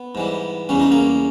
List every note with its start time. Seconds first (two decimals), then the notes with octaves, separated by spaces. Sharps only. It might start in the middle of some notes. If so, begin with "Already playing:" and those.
Already playing: B3
0.15 G#2 E3 G3
0.69 E2 C#3 G3 C#4
0.80 D#4
0.92 A#3 C#4